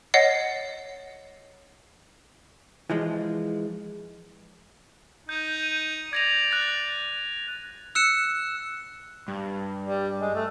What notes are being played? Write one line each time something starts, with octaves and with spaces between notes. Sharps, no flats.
C#5 D#5 F#5 A6 C7
E3 F3 G#3
D#4 G6
D#7
D5 G#6 A#6 F7
F#6 A6
E6 F#6 C#7 E7
G2
G3
G#3
A3